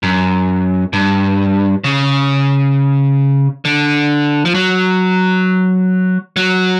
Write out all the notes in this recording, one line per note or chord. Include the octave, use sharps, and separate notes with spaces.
F#2
G2
C#3
D3
F3
F#3
F#3